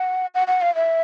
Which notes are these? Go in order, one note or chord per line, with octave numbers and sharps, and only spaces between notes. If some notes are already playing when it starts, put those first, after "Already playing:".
Already playing: F#5
F#5
F#5
F5
E5